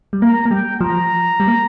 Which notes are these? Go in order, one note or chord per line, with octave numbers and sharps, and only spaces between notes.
G3
A#3 A#5
A#3
G3 G5
F3 A#5
G3
A#3